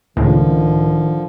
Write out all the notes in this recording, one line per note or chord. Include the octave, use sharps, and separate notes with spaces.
C#2 A2 D3 D#3 F3